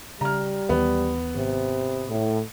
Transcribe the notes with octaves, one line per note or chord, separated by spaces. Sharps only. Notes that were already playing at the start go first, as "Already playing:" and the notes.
C#3 G3 A#5 F6
D#2 D#3 E3 B3
G#1 C3
A2